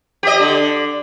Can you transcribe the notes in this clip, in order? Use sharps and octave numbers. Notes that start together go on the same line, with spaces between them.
G4 D#5
D3